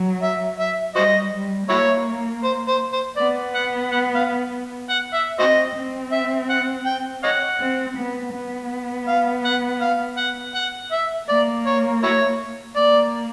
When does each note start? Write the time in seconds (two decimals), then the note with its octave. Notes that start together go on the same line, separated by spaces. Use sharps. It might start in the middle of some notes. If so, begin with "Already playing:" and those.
Already playing: F#3
0.22 E5
0.59 E5
0.95 G3 F#4 C5 D#5
1.32 G3
1.69 A#3 E4 F#4 C#5
2.44 C5
2.68 C5
2.93 C5
3.17 B3 D5
3.55 F#5
3.92 F#5
4.15 F5
4.90 F#5
5.14 E5
5.38 C4 F#4 C5 D#5
5.75 C4
6.12 E5
6.50 F#5
6.86 G5
7.24 C#5 D#5 F#5
7.60 C4
7.97 B3
8.34 B3
9.08 F5
9.45 F#5
9.81 F5
10.17 F#5
10.55 F#5
10.92 E5
11.28 A#3 D5
11.66 C#5
12.03 E4 F#4 C#5
12.76 A#3 D5